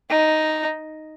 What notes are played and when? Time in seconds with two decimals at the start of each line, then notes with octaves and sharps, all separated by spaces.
0.11 D#4